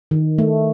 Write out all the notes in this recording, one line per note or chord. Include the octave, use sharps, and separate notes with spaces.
D#3
A3